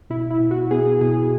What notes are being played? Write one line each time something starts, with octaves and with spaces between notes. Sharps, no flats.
B2 E4
E4
B2
F#4
B3 G#4
B2 G#4